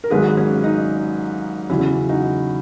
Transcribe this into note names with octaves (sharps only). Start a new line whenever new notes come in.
A#4
G#1 G#2 F#3 G#4 B4
C#4
D#4
E2 C#3 F#3 C#4 E4
D#4 F#4